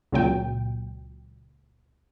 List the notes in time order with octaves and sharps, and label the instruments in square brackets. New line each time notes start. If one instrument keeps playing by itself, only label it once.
[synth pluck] C#2 A#2 F#3 G5